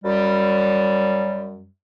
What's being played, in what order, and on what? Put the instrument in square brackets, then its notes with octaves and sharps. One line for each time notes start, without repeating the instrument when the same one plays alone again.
[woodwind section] F#2 G3